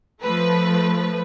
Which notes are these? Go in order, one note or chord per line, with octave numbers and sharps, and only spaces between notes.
F3 A3 B4